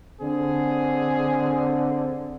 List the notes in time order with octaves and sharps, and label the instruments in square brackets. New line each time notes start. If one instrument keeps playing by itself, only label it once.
[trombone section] D3 C4 [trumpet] G#4